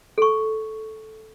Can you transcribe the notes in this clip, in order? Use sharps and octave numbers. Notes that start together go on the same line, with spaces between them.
A4 C#6